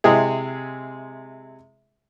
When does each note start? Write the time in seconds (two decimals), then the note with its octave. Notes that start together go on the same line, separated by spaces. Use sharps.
0.04 C3 G#3 E4 G#4